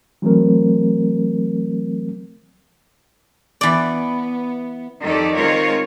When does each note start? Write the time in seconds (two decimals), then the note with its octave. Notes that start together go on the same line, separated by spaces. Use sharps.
0.22 E3 F#3 A3 C4 A#4
3.61 E3 B3 D5
5.03 F2 D#3 G4 A4 D5
5.37 D#3 G#3 C4 F4 A#4 C#5